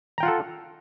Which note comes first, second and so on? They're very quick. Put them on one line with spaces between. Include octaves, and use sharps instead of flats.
A#5 G5 F4 F#5 A4